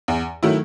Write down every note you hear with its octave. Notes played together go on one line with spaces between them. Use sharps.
E2
D#3 F#3 A3 E4